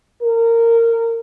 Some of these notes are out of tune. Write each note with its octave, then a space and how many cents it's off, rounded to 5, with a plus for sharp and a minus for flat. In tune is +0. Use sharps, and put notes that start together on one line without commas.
A#4 -20